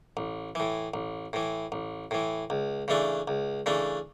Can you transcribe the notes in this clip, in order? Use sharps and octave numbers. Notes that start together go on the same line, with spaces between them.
A1
A2 E3
A1
A2 E3
A1
A2 E3
C#2
C#3 E3 A3 D4
C#2
C#3 E3 A3 D4